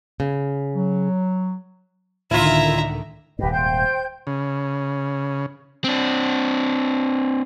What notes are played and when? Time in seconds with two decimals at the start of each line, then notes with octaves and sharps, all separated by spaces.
0.20 C#3
0.75 F#3
2.31 C#2 A2 D3 D#3 E4 F4 E5 A#5
3.39 D#1 G#2 G4 B4 D#5
3.51 C5 G5 G6
4.27 C#3
5.84 C4 D4